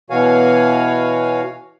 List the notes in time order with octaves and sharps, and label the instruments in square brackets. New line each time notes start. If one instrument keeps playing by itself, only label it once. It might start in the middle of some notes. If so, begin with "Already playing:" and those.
[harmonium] B2 E3 F#4 C#5 F5 G#5